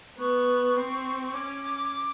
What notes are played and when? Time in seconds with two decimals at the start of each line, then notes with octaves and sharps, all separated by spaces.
0.18 B3 C#6
0.76 C4
1.26 C#6
1.34 C#4 D6